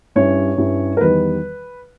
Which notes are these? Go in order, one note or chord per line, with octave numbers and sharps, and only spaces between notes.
G2 G3 C#4 E4 C#5
G2 G3 C#4 E4
A#4
E2 D#3 G3 B3 D#4 B4